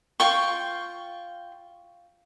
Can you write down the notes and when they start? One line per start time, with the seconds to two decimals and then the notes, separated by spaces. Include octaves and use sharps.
0.20 F4 G5 C#6